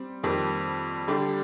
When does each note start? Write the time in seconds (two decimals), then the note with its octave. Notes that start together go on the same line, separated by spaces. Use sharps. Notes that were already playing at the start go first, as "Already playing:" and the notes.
Already playing: G3 C4
0.23 F2 D#3 G3 C4
1.08 D3 G3 D4 G4